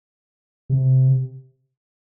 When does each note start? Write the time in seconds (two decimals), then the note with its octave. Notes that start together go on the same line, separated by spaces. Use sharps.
0.70 C3